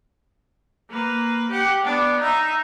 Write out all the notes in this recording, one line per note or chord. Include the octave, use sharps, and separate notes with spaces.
A#3 B4
G4 F#5
B3 D4
D#4 E5